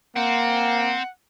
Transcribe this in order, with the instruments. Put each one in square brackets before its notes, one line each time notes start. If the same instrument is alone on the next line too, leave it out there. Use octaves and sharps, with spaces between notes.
[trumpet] A#3 [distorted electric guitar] C4 [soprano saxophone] F#5